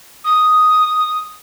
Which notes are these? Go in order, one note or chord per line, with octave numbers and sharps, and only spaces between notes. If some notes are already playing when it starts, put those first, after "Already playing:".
D#6